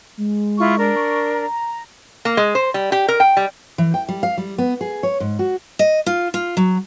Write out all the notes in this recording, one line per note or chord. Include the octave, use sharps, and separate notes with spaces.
G#3
E4 F4 C#6
D4 A#4
C#6
A#5
A#3
G#3
C5
G3
G4
A#4
G5
G3
E3
G5
G3
F5
G3
B3
G#4
C#5
G#2
F#4
D#5
F4
F4
F#3